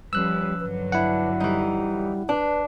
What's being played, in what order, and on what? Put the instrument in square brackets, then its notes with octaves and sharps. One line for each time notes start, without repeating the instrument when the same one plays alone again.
[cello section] F3 C#4 B4 [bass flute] G3 [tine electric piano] E6 F#6
[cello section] G2 D3 F#3 [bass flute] B4
[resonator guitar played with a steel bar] D4 [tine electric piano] E4 F#5
[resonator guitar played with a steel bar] E3 D#4 [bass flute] G3
[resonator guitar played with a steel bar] D4 [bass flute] B4